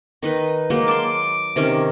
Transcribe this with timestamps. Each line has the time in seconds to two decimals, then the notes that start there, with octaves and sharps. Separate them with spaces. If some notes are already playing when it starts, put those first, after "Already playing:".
0.22 D#3 D#4 B4
0.70 F#3 G#3 A#3
0.88 A5 C6 D6
1.56 C3 D#3 C#4